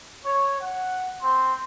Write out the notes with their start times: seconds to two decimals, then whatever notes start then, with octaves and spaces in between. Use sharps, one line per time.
0.25 C#5
0.60 F#5
1.22 C4 C6